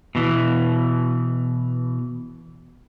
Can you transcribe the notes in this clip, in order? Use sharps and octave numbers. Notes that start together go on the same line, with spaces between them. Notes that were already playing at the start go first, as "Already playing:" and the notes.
B2 E3